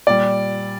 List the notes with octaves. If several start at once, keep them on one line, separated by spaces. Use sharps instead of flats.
A#2 G3 D5